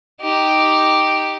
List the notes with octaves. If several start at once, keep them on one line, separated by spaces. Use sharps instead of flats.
D#4 G4